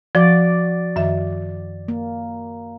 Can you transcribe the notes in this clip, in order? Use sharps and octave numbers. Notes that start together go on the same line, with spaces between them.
F3 F#4 D5
F#2 D#3 E5
A#3